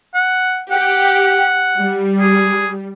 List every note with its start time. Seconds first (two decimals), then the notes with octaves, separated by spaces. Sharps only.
0.14 F#5
0.71 G4 F#5
1.78 G3
2.20 G#4